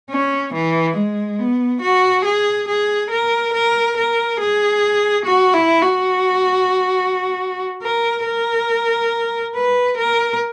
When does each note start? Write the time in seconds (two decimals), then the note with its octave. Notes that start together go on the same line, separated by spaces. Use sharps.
0.10 C#4
0.54 E3
0.97 G#3
1.39 B3
1.82 F#4
2.25 G#4
2.68 G#4
3.11 A#4
3.54 A#4
3.97 A#4
4.40 G#4
5.25 F#4
5.53 E4
5.82 F#4
7.83 A#4
8.26 A#4
9.55 B4
9.97 A#4